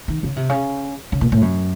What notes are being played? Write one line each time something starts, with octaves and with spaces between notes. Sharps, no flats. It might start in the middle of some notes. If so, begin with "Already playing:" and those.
D#3
C#3
C3
C#3
C#3
A#2
A2
F#2